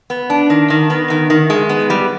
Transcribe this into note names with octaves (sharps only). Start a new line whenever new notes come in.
B3
D4
D#3
D#3
B3
D#3
D#3
G#3
B3
G3